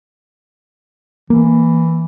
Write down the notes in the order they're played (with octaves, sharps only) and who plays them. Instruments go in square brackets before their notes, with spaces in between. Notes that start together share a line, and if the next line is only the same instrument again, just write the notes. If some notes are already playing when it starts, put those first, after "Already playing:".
[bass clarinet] E3 [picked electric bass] A#3